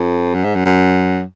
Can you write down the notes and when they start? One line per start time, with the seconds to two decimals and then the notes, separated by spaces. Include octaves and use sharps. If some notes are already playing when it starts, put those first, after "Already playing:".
Already playing: F2
0.35 F#2
0.44 G#2
0.55 F#2
0.65 F#2